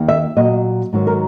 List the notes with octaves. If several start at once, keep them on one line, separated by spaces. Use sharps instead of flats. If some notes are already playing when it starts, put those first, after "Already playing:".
Already playing: D#2 D#3
E5
A#2 F#3 D#5
G#2 D#3 F#3
A#4